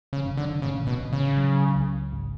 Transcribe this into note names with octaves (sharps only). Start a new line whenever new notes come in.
C#3
F#1
D3
A1 C#3
B2
A1
C#3
F#3
C#2
G#1